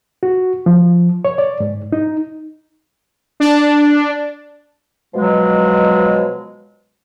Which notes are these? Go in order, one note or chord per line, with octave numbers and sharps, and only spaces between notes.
F#4
F3
C#5
D5
G#2
D#4
D4
B2 F3 F#3 G#3